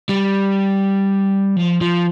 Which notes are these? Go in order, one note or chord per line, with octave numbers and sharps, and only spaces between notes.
G3
F3
F3